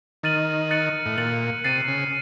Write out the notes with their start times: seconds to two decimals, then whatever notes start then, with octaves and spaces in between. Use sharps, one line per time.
0.23 D#3 F6 A6 D#7 F#7
0.71 F#6 A6 C#7 F#7
1.06 A2
1.17 A#2 F#6 A6 C#7 F#7
1.64 C3 A6 C7 D#7
1.88 C#3